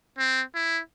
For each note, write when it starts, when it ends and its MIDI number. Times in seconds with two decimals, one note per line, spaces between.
0.18 0.42 60
0.54 0.80 64